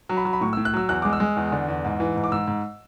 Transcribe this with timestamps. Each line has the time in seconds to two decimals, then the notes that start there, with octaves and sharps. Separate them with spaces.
0.09 F#3
0.17 B5
0.25 F#3
0.33 B5
0.41 A2 C#6
0.53 E6
0.57 A2
0.65 F#6
0.74 F#3 E6
0.89 E2 F#6
1.02 G#3 D6
1.13 E6
1.20 G#3
1.37 E2
1.52 D3
1.68 E2
1.85 G#2
2.00 E3
2.16 G#2
2.24 D6
2.32 G#2 E6
2.48 G#2